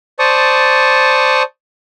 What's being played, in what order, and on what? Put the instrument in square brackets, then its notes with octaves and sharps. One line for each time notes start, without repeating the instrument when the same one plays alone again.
[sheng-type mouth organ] C5 D5 A5 C#6 D#6